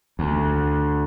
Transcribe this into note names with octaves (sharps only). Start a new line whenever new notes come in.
D2